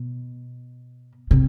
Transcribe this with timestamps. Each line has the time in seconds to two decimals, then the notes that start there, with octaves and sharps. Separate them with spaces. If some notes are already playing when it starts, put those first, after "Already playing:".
Already playing: B2
1.31 C3